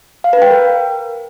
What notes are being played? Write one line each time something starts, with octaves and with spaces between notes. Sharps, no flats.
F5
B4
G5
A#4